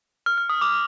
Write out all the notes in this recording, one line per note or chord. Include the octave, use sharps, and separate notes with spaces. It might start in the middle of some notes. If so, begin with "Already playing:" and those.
F6
F6
D#6
D6